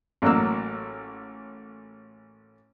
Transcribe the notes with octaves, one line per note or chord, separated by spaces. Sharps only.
A1 F#3 A#3 E6